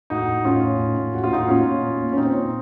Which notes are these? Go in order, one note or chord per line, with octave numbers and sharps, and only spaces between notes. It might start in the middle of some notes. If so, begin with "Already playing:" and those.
A2 D#4 F#4
A2
A2 C#4 F4
A2
A2
A2
A2 F#4
F4
A2 D#4 F#4
A#2 C#4 F4
A#2
A#2
A#2
C#4
A#2 C4 D#4
A#2